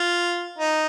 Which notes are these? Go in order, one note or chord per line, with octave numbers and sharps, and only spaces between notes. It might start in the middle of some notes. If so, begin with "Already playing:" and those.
Already playing: F4
D#4